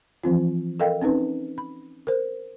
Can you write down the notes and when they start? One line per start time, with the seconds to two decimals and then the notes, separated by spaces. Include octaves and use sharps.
0.23 E3 F3 C4 F4
0.80 A4 A#4 D#5 F5 G5
1.01 C4 C#4 D#4 B4
1.58 B5
2.07 A#4 C5